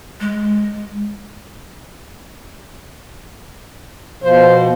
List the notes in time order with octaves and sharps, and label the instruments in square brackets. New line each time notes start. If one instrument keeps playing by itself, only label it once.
[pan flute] G#3
[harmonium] B2 F3 [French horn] C5